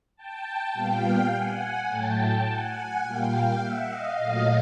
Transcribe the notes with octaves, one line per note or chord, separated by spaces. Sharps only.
G5 A5
A#2 G3 B3 F5 G5
F#5 G#5
A2 F#3 A3 G5 A5
F#5 G#5
A#2 G3 A#3 F5 G5
E5 F#5
D#5 F5
A#2 F#3 A3